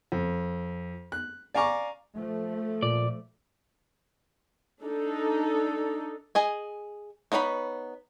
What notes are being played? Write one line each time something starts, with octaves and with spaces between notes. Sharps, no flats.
F2
F#6
D5 F5 G#5 A#5 C#6 D6
F3 A3
A#2 D5
D4 D#4 A4
G#4 D#5 G#5
B3 D#4 C#5 D5 B5